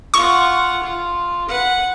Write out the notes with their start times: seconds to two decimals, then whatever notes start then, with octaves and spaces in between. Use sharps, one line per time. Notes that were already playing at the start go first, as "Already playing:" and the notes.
0.14 F4 F#5 C#6
0.83 F4
1.48 B4 F#5